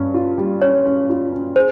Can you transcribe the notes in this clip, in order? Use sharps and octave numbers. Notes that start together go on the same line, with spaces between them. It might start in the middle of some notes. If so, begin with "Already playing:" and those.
Already playing: G2 C#4
F4
G3
C#4 C#5
C#4
F4
C#4
G#4 C5